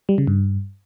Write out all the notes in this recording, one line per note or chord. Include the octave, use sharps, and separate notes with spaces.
G3
C#3
G2